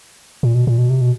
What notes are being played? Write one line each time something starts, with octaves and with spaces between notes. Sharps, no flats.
A#2
B2
A#2
B2
C3
B2